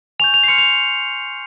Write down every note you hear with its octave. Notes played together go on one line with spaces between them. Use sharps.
G#5 C#6 G6 F7
F7
C7
C6 F6 C#7
F7